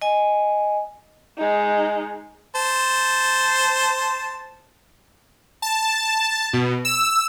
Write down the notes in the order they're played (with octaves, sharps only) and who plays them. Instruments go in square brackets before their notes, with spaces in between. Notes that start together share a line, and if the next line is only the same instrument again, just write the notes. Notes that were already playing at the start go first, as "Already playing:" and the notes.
[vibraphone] D#5 G#5
[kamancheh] G#3 D#4
[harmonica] C5 A5
[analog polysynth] A5
B2
E6